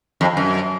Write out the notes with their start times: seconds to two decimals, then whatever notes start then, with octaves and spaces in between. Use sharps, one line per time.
0.21 F2
0.37 F#2